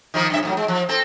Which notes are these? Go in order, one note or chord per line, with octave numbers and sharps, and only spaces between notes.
D#3 F3 A#3
G2 C#3 E5
F2 A2 F#3
G#3
F3
C4 A4